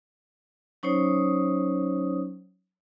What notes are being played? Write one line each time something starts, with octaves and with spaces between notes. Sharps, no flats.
F#3 C#4 D#4 C5 C#5 D#6